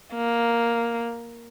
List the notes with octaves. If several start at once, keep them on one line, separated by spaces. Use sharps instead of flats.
A#3